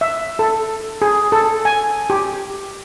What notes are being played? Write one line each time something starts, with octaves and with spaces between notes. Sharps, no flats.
E5
A4
G#4
A4
G#5
G4